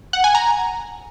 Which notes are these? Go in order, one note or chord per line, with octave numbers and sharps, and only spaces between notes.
F#5
G#5
A#5